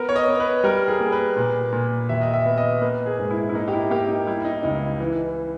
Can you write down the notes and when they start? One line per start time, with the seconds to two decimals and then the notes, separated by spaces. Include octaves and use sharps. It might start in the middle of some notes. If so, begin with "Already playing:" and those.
Already playing: B3 A#4
0.09 C#5
0.16 D#5
0.28 B3
0.40 B4
0.64 G3 A#4
0.88 G#4
1.00 A#3
1.12 B4
1.36 A#2
1.72 A#2
2.09 D#2 E5
2.21 D#5
2.34 E5
2.45 B3
2.58 D#5
2.81 A#3 B4
3.06 G#4
3.19 G#2
3.30 E4
3.49 E4
3.54 A#3 D#4
3.68 G4
3.73 E4
3.90 A#3 G4
4.08 D#4
4.27 G3 E4
4.45 D#4
4.63 C#2 D#4
5.00 E3